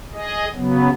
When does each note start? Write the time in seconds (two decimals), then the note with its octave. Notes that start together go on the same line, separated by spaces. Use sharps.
0.13 G#4 D#5
0.55 C#3 F#3 B3